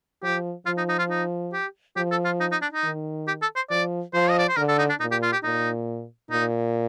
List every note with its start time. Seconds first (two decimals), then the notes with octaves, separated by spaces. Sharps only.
0.23 F3 G4
0.66 F3 F4
0.78 D#4
0.89 D#4
0.99 F4
1.10 D#4
1.53 G4
1.96 F3 G4
2.11 A4
2.25 F4
2.41 D#4
2.52 D#4
2.62 D4
2.73 D#4
2.84 D#3
3.28 G4
3.42 A4
3.56 C5
3.70 F3 D5
4.14 F3 C5
4.30 D#5
4.38 D5
4.49 C5
4.57 D3 A#4
4.69 A4
4.78 D#4
4.90 D4
5.00 A#2 D#4
5.12 G4
5.23 F4
5.33 G4
5.44 A#2 D#4
6.31 A#2 D#4